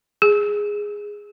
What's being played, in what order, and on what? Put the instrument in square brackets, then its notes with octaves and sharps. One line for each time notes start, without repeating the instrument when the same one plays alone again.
[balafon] G#4